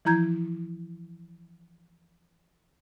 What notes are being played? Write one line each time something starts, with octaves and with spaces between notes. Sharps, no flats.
E3 F3 E4 A#5 G6 G#6